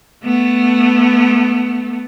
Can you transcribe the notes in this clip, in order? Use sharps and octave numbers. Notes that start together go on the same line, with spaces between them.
A3 B3